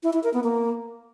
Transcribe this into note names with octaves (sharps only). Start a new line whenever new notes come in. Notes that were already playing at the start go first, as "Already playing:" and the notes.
E4
E4
A#4
B3
A#3